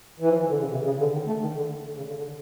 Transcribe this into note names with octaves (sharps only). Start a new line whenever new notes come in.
E3
F3
E3
D3
C#3
C3
C#3
D3
D#3
A3
D#3
D3
C#3
D3
D3